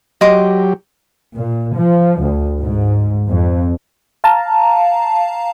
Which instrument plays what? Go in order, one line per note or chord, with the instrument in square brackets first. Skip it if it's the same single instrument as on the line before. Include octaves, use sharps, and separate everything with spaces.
[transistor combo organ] F#3 G4 [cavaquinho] D#5 C6 D6
[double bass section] A#2
F3
D2
G#2
F2
[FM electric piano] F5 A5 A#5